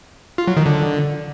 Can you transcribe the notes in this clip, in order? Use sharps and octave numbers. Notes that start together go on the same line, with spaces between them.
F4
F#3
D#3
D3